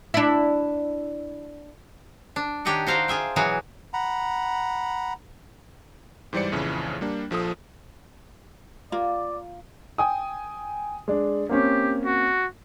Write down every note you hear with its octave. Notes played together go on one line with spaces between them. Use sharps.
D4 E4
D4
D#3 D4 G4 C#5 D#5 F#5
F#4 C5 F5 G5 A#5
F4 G#4 E5 G5
B2 E3 F#3 F#4 G#4
F#5 A#5 B5
G#2 E3 G3 C5 D5 C#7
A#1 F2 C#3 E3
G3 A#3 D4
A#1 F3 A4 D#6
A#3 F4 D5
G5 G#5 D#6
G#3 D4
A#3 C4 C#4 G4
F#4